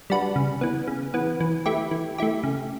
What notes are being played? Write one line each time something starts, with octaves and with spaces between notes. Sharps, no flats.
G3 D4 F#4 B4
C#3
E3 B3
C#3
E3 B3
E3
A3 E4 G4
E3
A3 E4 G4
C#3